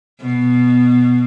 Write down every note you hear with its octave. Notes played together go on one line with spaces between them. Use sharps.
B2